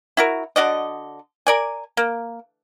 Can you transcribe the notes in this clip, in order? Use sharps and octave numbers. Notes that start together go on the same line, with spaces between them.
E4 F#4 A#4
D3 F#4 D5 D#5
A#4 D5 G#5
A#3